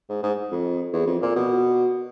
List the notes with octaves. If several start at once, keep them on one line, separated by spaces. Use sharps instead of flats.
G#2
G#2
F2
E2
F2
A#2
B2